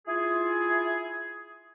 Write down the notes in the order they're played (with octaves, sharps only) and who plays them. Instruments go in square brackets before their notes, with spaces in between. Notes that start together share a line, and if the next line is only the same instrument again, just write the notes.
[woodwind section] E4 F4 G#4